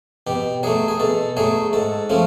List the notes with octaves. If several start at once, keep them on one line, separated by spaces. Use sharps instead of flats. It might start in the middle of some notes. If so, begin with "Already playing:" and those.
B2 G4
F#3 A3 G#4
G#4
B2 A4
F#3 A3 G#4
G#2 A4
F3 A3 C#4